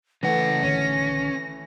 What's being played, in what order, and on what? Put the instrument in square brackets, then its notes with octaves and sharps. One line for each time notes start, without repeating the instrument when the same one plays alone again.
[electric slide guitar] C#3 F#5 [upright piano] E3 A3 [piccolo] A#6
[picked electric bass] A#1 D3 D#3 [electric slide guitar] C#4